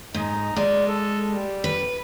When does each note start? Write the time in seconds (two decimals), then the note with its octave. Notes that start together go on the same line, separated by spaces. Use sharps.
0.14 G#2 D#4
0.56 G#3 D5
0.88 A4
1.31 G3
1.64 B4